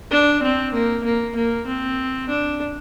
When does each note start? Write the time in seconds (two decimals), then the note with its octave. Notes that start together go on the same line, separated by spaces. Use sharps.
0.11 D4
0.43 C4
0.73 A#3
1.04 A#3
1.36 A#3
1.67 C4
2.29 D4